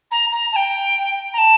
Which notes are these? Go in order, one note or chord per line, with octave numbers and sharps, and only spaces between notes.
A#5
A#5
A5
G5
A#5
A5